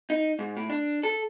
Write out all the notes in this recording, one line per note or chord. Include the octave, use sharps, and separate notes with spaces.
D#4
G#2
A2
D4
A4